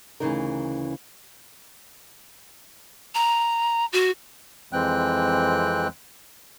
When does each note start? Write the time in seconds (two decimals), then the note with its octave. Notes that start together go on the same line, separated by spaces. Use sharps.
0.20 D2 C#3 E3 D#4 A#4
3.15 A#5
3.93 F#4
4.73 F2 E3 G#3 C4 G5 F#6